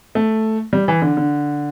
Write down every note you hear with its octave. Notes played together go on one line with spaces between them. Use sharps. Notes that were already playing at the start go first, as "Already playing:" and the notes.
A3
G3
E3
D3
D3